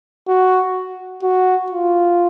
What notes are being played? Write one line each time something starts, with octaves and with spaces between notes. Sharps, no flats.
F#4
F#4
F4